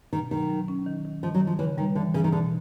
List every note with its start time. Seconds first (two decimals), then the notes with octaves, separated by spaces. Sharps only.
0.13 B2 D#3
0.31 D#3 F#3
0.50 F#3
0.68 C#4
0.86 D#3
1.05 D#3
1.23 D#3 F3
1.35 F#3
1.41 D#3
1.47 F3
1.59 C#3 E3
1.78 D#3 G3
1.95 D3 E3
2.14 C#3 E3
2.24 D#3
2.32 B2 D3